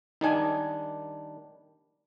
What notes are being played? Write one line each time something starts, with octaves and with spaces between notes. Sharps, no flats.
D#3 G3 D4 D#4 G#5